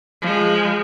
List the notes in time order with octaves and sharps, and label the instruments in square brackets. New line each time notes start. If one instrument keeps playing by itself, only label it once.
[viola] F3 G#3